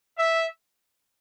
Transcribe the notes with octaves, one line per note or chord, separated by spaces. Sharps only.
E5